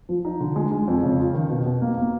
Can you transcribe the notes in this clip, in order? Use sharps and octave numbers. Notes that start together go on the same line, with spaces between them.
F3
D#4
D3
G#3
G#3
F2
C#3
F4
D#3
B2
B2
A#3
A#3